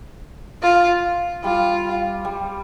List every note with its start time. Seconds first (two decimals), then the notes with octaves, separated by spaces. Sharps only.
0.62 F4
1.44 G3 F4
2.25 G3